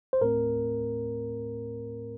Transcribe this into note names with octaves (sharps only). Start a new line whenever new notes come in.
C5
A2 A3 C4 A#4